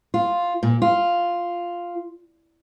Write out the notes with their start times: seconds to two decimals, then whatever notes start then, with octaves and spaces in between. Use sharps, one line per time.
0.14 F4
0.63 A#2
0.82 F4